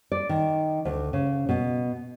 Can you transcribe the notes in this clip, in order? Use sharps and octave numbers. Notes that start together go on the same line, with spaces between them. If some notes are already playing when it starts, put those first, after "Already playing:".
D5
D#3
D2
C#3
B2